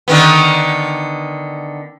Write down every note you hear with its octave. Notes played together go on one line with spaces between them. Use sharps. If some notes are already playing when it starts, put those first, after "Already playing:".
D3 D#3 B3